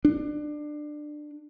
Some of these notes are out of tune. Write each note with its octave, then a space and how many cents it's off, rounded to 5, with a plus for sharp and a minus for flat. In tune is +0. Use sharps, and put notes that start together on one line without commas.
D4 +20